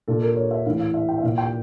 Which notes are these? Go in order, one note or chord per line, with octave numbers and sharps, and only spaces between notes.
A#2 A4
A#4
C#5
E5
A2 E3 F5
F5
E5
G5
E5
A#2 F5
G5